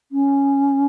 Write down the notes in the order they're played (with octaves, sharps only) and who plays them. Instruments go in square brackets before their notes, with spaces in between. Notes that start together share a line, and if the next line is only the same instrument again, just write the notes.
[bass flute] C#4